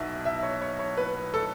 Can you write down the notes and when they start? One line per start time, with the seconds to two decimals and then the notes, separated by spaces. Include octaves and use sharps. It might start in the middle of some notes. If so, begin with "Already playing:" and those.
Already playing: B1 B2 E5
0.25 E5
0.43 C#5
0.62 C#5
0.79 C#5
0.97 B4
1.34 A4